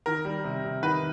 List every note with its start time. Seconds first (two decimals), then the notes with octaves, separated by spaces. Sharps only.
0.06 D#3 A#4
0.25 G3
0.44 C3
0.64 C3
0.83 D#3 B4